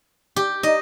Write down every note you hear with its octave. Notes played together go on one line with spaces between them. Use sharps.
G4
D#4 D#5